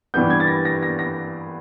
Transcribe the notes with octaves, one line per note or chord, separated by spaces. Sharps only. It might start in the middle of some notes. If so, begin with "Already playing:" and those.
G2 E3 G3 B3 D4 G6
G#6
A6
A#6
A#6
A#6
A#6